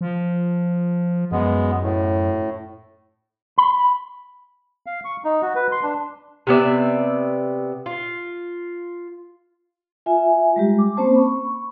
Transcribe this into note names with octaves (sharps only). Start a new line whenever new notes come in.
F3
F#2 G#3 B3
A2
B5
F5
C#6
D#4
F#4
B4
C6
D4
C3 B3 D5 E5
F4
F4 E5 G#5
G3 G#3 G4
D6
A#3 C4 C#4 C5 A5
B5 C#6